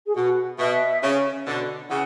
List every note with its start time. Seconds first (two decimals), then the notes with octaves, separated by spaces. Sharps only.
0.06 G#4
0.15 B2 F#4
0.59 B2 E5
1.03 C#3
1.46 B2 D3
1.90 C#3 E3 F#5